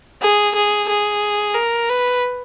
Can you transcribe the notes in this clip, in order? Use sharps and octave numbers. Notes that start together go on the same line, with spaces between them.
G#4
G#4
G#4
A#4
B4